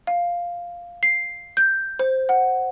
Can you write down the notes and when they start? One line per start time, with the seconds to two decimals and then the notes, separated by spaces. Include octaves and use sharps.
0.07 F5
1.03 C7
1.57 G6
1.99 C5
2.29 F#5